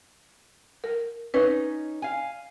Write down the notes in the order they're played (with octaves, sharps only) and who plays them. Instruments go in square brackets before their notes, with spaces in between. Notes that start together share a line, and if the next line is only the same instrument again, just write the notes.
[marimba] A#4
[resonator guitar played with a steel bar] C#4 D#4 [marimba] B4
[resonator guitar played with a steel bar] F5 G#5